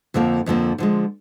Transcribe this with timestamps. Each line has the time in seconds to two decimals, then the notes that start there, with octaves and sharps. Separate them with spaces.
0.14 F2 D3 F3 A#3
0.46 F2 D3 F3 A#3
0.78 D3 F3 G#3